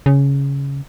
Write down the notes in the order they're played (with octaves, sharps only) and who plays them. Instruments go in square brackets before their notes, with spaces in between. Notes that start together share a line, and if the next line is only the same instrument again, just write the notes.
[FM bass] C#3